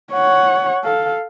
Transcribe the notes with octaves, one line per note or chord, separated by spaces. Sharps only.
C#5 F#5
A4 F5